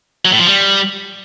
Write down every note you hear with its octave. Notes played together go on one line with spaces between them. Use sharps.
F#3
A2
F3
G3